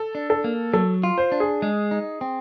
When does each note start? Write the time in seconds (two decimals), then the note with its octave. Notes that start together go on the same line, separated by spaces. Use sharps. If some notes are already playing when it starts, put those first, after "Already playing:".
Already playing: A4
0.15 D4
0.30 A4
0.44 A#3
0.73 F#3 A4
1.04 F4
1.18 C5
1.32 D4
1.40 G#4
1.62 G#3
1.91 D#4
2.21 C4